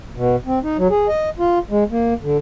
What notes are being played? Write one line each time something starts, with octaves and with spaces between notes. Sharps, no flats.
B2
C4
D#4
F#3
G#4
D#5
F4
G#3
A#3
D3